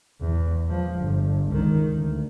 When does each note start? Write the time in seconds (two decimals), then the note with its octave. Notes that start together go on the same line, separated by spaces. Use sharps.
0.21 E2
0.69 F3
0.99 G1
1.49 C#2 D#3
1.95 D2